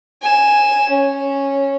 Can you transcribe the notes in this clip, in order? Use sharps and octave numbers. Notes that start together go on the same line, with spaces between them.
G#5 E7
C#4